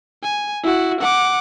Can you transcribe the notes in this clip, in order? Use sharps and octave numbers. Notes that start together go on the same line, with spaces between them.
G#5
E4 F#4
F#5 D6